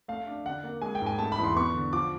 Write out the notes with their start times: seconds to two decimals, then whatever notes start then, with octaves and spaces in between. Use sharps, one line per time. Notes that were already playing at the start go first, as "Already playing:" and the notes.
0.08 A3 F5
0.27 D4
0.45 D3 F#5
0.64 A#3
0.82 G#3 G#5
0.95 G5
1.01 G#2
1.06 G#5
1.19 A3 A5
1.32 B5
1.38 E2
1.44 C6
1.56 B3 C#6
1.74 D3
1.92 F3 D6